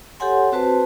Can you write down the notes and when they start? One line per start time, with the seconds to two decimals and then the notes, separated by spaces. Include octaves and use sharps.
0.20 G4 A4 C#5 F#5 G#5 C6
0.52 C4 F#4 B4 C5 A5